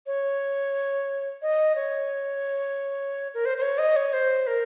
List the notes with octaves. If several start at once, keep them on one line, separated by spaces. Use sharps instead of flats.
C#5
D#5
C#5
A#4
C5
C5
C#5
D#5
C#5
C5
A#4